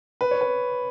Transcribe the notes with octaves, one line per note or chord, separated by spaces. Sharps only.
B4
C#5
B4